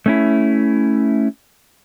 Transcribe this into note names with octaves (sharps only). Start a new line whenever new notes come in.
A3 C#4 E4